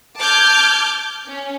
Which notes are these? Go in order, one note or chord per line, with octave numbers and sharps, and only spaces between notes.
A5 D6 F6 G6 G#6
C#4